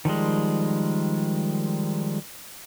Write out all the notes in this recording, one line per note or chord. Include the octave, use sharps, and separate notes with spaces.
D#3 F3 G3 G#3